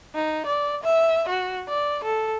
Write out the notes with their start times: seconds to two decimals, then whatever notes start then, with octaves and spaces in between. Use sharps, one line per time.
0.15 D#4
0.46 D5
0.84 E5
1.29 F#4
1.68 D5
2.04 A4